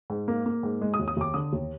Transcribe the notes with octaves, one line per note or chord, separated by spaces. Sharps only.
G#2
A#3
A#3
G#2
G#3
D#6
D#2
D#6
D#2 D6
D3 D#6
D#2